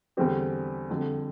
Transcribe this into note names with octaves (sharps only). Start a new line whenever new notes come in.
E2 D3 G3 C4 G4
F2 D3 G3